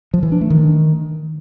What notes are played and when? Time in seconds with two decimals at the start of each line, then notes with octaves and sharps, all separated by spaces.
0.14 F3
0.23 E3
0.32 D4
0.41 A3
0.50 D#3